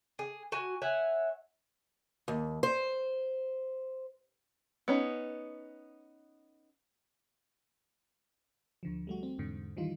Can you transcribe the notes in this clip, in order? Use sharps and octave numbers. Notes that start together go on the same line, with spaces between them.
G#4
F#4 G#5
C#5 E5 F#5 G#5
D#2
C5
B3 C#4 D#4
D2 D3 F3
G3 A3 F#4
C4
E2 G#2 D3
D#3 E3 G3 D#4 F4